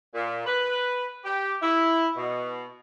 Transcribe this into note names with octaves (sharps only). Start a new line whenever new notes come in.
A#2
B4
G4
E4
B2